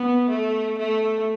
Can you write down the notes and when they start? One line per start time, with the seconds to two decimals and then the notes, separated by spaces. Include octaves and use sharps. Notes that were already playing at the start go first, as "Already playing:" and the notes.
Already playing: B3
0.30 A3
0.78 A3